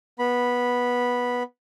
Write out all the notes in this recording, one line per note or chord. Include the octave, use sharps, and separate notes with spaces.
B3 B5